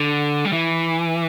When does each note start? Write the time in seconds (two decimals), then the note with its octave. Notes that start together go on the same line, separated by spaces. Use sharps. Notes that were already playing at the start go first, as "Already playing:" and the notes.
Already playing: D3
0.45 G3
0.53 E3